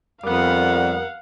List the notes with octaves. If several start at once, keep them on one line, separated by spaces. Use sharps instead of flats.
F2 G3 B3 A#4 F5 F#5